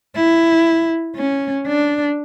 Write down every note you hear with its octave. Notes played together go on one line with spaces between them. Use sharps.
E4
C#4
D4